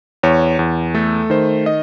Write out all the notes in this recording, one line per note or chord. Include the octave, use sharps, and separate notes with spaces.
E2 C#5
E2
A3 A4
D#3 C5
D#5